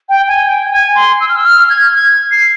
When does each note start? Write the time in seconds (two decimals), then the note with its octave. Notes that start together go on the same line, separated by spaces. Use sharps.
0.09 G5
0.28 G#5
0.46 G5
0.71 G#5
0.95 C6
1.20 E6
1.28 F6
1.36 E6
1.45 F6
1.69 G#6
1.94 G#6
2.31 C7